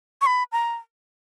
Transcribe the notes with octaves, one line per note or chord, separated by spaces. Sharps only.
C#6
B5
A#5